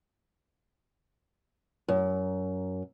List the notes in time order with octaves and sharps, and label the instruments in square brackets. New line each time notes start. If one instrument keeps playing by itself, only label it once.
[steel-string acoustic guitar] F#2